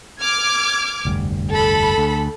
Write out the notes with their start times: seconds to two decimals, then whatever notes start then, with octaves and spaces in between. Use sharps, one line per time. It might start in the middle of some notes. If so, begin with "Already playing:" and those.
0.19 D6 F6 G#6
1.05 F1 D2 G2
1.54 A4 B5
1.98 D2